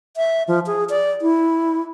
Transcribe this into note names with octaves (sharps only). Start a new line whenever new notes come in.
E5
F3
G#4
D5
E4